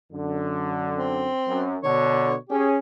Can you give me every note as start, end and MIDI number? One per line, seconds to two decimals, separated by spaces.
0.12 1.30 42
0.12 1.30 50
0.97 1.69 60
1.48 1.77 42
1.83 2.35 47
1.83 2.35 50
1.83 2.35 73
2.49 2.78 61
2.49 2.67 67
2.49 2.78 68